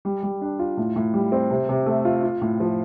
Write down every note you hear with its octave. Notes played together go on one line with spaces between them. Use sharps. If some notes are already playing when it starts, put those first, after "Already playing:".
G3
G3
D4
F4
A2
A2
G3
C4
C3
C3
A3
F4
F4
A2
F3